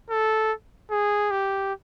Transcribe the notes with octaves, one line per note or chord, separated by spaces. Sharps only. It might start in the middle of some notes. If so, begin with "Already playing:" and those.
A4
G#4
G4